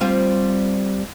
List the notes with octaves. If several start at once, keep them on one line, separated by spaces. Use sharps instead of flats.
G3 C4 F4